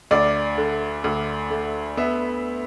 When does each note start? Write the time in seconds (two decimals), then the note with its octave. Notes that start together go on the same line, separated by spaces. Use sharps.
0.11 D2 D5
0.58 D3
1.04 D2
1.50 A3
1.97 B3 E5